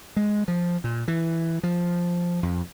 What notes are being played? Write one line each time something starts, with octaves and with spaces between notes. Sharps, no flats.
G#3
F3
A#2
E3
F3
F2